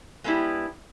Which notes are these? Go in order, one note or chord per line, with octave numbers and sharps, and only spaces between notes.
G#3 A3 B3 D4 E4 G4